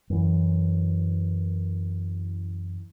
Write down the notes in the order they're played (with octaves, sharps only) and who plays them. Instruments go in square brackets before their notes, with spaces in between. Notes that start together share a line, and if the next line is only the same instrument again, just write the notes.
[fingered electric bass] F#2 E3